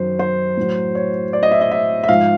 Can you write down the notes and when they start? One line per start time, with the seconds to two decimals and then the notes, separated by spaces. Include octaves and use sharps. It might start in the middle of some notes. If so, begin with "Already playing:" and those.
Already playing: F#2 D#3 F#3 C5
0.19 C5
0.57 A2 F#3
0.95 C#5
1.33 D5
1.43 D#5
1.51 E5
1.61 D#5
1.71 E5
2.04 E5
2.08 G#2 F3 F5